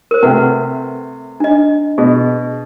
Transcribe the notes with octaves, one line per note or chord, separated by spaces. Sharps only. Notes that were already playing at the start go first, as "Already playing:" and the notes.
A#4 C5
C3 A3 B4 F#5 G5
D4 D#5
B2 G#4